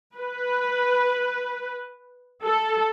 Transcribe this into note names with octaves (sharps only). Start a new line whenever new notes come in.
B4
A4